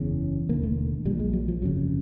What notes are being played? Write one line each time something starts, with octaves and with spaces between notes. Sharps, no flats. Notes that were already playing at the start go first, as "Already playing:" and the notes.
Already playing: F#1 E2 C#3
E1 D#2 D3 A#3
A3
A#1 A#2 G3
G#3
F#3
F3
G1 F2 C#3 F#3